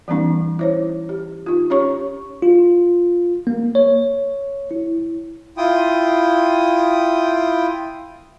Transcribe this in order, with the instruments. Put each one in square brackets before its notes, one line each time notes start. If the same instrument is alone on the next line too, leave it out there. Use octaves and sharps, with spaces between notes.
[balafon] E3 G3 B3 C#4 D#4
E4 C5 C#5
G4
D#4 F4
C#4 G4 C#5 C#6
[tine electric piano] F4
A#3
C#5
E4
[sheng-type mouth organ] E4 F4 G5 D#6